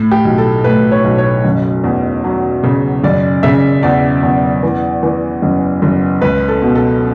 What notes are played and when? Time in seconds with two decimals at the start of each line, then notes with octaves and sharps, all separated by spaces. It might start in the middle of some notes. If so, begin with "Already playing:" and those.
Already playing: A2
0.12 G4
0.25 B1
0.38 A4
0.64 A2 B4
0.92 C#5
1.04 B1
1.18 C#5
1.45 F#1
1.84 E2
2.24 F#3
2.64 C#3
3.04 F#1 D5
3.43 C#3 E5
3.83 E2 D5
4.23 E2
4.63 E3
5.03 E3
5.42 F#1
5.82 F#1
6.22 C#2 B4
6.48 A4
6.62 B2
6.75 A4